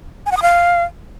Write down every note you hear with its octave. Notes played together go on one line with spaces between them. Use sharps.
G#5
F#5
D#6
F5